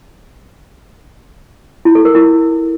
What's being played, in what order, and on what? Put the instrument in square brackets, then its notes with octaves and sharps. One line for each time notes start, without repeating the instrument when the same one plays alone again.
[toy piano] E4
A4
A#4
E4